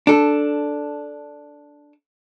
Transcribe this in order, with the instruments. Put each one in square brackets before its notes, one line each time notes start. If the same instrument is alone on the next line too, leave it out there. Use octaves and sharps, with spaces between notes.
[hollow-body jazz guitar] D4 A4